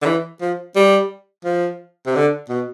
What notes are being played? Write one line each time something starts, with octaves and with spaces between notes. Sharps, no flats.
D3
E3
F3
G3
F3
C3
D3
B2